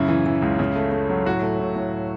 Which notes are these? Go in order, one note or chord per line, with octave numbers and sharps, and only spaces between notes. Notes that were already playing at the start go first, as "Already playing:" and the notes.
Already playing: F#2 C#3 E4
E3
E3
C#2
C#3
A3
A3
F#3
A2 F#4
A3
A2
A2